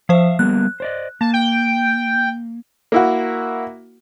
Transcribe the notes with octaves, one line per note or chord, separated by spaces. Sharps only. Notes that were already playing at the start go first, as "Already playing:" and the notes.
F3 C5 E5 F5
G3 A#3 B3 F#6
C5 D5 D#5
A#3 A5
G5
A#3 E4 F#4